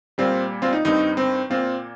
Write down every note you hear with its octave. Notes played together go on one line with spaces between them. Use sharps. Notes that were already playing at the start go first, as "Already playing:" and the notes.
A#2 G3 A#3 C4 F4
C4 F4
D#4
G2 D#3 C4 D#4
C4
A#2 A#3 C4 F4